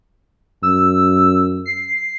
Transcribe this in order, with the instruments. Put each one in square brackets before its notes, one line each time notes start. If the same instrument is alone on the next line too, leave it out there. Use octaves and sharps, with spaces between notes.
[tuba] F#2 [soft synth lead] E6
[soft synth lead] C7